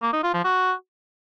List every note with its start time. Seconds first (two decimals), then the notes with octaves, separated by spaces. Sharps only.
0.02 A#3
0.13 D#4
0.23 F4
0.34 F3
0.44 F#4